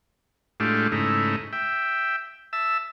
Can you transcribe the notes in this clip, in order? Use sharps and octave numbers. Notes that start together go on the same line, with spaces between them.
A2 G#3 A3 D4 F4 G4
G#2 C#3 A3 D#4 E4
E5 G5
E5 A5 E6